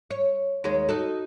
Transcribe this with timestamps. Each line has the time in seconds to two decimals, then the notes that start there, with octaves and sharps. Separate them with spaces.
0.11 C#5
0.64 D#2 G#3 C#5
0.89 D#4 F#4 A4